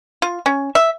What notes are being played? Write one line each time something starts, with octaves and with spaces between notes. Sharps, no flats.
F4
C#4
E5